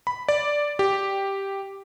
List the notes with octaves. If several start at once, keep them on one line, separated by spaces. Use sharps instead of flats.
B5
D5
G4